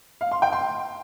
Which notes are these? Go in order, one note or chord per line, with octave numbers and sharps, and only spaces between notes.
F5
C6
G5
C6